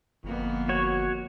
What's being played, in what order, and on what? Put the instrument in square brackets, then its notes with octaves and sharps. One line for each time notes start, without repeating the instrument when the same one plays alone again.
[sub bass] G1 [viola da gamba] F2 A#3 B3
[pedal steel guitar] F#4 C#5